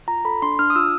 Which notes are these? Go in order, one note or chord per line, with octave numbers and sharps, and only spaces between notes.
F4 A#5
A4 B5
D4 C6
D4 F6
D#6
F4 E6